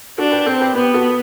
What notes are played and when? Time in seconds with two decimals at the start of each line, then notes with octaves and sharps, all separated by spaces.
0.18 D4 F#4 A4
0.31 G4 B4
0.46 C4 A4 C5
0.60 G4 B4
0.75 B3 G4 B4
0.94 F#4 A4